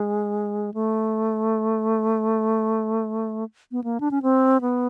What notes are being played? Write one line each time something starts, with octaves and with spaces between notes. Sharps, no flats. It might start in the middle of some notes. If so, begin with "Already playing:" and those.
Already playing: G#3
A3
B3
A#3
D4
C#4
C4
B3